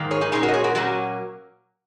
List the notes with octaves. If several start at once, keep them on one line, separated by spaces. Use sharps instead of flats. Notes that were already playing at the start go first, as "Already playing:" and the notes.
Already playing: G#2 D#3 A#3
G#4 C#5
D#4 G#4
A#2 G#3 C#4 D#4 G#4
F#4 A#4
D#5
G#4 C#5
F#4 A#4
A#2 F#3 A#3 C#4 F#4